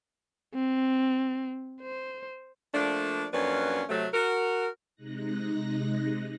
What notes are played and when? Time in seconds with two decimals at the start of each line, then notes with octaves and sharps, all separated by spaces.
0.55 C4
1.82 C5
2.73 F3 A3 A#3 D4
3.32 F2 F#3 A#3 C#4 D4 B4
3.89 C3 F#3 A3
4.13 F#4 A#4
4.96 C3 G#3 D#4 F#6 A#6